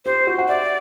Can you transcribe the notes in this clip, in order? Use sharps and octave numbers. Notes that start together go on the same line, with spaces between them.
G4 C5
F#4
F#5
D5 E5